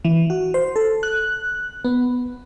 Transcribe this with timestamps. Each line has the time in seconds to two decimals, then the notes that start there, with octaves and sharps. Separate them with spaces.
0.05 E3
0.30 F#4
0.54 C5
0.76 A4
1.03 F#6
1.85 B3